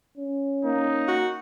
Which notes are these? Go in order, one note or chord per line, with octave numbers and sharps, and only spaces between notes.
C#4
A#3 D#4
F#4